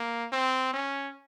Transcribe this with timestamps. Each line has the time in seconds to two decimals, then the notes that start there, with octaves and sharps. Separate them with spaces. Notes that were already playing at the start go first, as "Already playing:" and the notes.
Already playing: A#3
0.32 C4
0.74 C#4